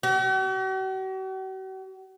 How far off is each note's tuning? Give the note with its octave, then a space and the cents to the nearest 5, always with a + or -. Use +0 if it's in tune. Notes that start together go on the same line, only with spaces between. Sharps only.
F#4 +45